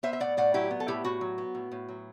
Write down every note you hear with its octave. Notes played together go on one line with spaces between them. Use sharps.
B3 C5 E5
E5
A2 D5 F#5
A2 D5 F#5
F#3 E4 G4
B3
A4
A2 E4 G4
A2 F#4
F#3
B3
A2
A2
F#3